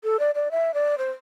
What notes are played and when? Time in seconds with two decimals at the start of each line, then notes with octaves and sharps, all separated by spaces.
0.04 A4
0.19 D5
0.35 D5
0.51 E5
0.74 D5
0.98 C5